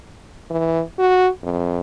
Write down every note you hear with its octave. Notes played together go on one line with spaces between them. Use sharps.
E3
F#4
F2